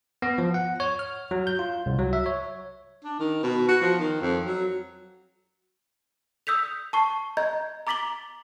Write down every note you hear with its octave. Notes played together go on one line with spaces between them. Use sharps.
B3
F3
F#5
C#5
F6
F#3
G6
F4
C2
F#3
E5
C#5
D4
D#3
B2
F#4
F3
D#3
F2
F#3
D#6 E6 G6 B6 F7
A5 C#6 C7
D#5 A#5 G6 G#6
A#5 D6 A6 B6 F#7 G7